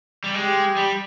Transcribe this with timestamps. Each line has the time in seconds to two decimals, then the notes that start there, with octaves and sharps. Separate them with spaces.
0.24 G3
0.34 G#3 G4
0.76 G3